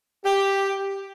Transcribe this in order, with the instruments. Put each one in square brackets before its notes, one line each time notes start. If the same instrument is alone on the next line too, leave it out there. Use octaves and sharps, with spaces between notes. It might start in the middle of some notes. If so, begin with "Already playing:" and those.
[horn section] G4